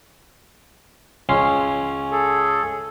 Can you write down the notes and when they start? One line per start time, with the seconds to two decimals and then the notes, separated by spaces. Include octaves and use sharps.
1.29 C#2 C#4 C6
2.12 G#4 A4